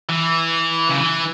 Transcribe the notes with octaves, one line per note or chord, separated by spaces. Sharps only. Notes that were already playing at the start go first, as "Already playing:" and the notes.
E3
C#3
E3